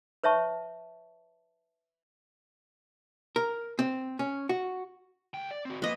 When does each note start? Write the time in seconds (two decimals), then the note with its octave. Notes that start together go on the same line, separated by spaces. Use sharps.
0.24 B4 C#5 E5 A5 C#6
3.36 A#4
3.79 C4
4.19 C#4
4.49 F#4
5.34 C#2 G5
5.51 D5
5.65 C4 F#4
5.82 F3 A#3 B4 D#5